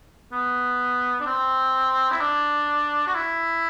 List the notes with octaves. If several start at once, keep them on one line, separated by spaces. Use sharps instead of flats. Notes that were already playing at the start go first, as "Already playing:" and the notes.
B3
D4
C4
E4
D4
F#4
E4